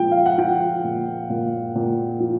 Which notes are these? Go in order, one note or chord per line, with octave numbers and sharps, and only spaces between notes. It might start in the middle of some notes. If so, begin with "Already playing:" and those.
Already playing: A#2 F3 G#3 G5
F5
F#5
F3 G5
A#2
A#2
A#2
F3